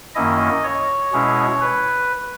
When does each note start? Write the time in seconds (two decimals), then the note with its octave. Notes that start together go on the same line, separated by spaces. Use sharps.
0.15 F#2 D#3 A#3 C#4 E4 D#5
0.64 C#5
1.13 B2 G#3 C#4 E4
1.61 B4